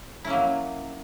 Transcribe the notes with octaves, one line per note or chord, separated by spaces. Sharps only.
F#3 A#3 C#4 E4